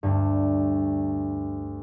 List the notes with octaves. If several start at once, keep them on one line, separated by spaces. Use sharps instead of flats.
D2 G2